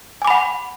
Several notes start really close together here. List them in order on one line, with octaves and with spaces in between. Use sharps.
G#5 D6 B5 F#5